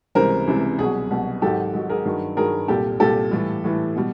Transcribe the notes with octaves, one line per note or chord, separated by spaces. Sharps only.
C#2 C3 E3 G3 A#4 C5
C#2 C3 E3 G3
C2 B2 F#3 G#4
C2 B2 F#3
G#2 D#3 F#3 G4 A4
G#2 D#3 F#3
G#4 A#4
G2 D#3 F#3
G2 D#3 F#3 G#4 A#4
C2 A#2 G3 G4 A4
C2 A#2 G3 G4 A4
A2 E3 G3
A2 E3 G3
B2 G3